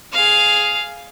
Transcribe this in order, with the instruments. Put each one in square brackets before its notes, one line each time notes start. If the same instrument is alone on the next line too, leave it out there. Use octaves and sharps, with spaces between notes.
[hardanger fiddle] G#4 F5